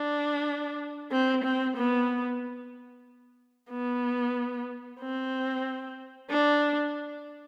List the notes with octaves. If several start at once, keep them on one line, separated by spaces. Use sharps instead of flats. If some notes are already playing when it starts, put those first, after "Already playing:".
Already playing: D4
C4
C4
B3
B3
C4
D4